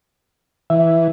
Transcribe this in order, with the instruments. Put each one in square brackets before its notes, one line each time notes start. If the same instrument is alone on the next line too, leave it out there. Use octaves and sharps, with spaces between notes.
[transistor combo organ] E3 [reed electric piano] E5